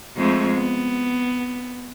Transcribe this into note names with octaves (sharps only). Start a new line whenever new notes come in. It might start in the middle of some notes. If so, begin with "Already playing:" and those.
F2 G#3 A3
B3